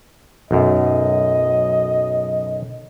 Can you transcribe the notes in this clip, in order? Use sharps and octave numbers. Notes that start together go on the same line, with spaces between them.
B1 F#2 D#5